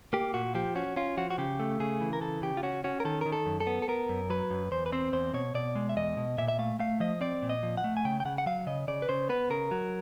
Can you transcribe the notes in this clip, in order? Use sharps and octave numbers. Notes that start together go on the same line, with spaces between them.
A#3 G4
A#2 F#4
F3 G4
C#4 F#4
C#4 F4
F3 F#4
F#4
C#3 G4
A3
C#3 G#4
E3
A#4
C#3 A4
C#3 G4
F4
C#4 F#4
C#4 F#4
A#4
D#3 A4
D#3 A#4
A4
F#2
A4
B3
A4
B3 A#4
F#2
F#3 B4
F#2
E2 C5
B4
C4 C5
E2 C5
B2 C#5
B2 D5
G#3
E5
E2 D#5
B2
A#2 E5
E5
A3 F5
A3 F5
F3 D#5
C4 D5
A#2
D#5
F3
F#5
A3
G#5
C#3 G5
G5
C#3 F#5
F#5
F#3 F5
C#3 D#5
C#3 D5
B4
C#3 C5
B3 B4
C#3 A#4
F#3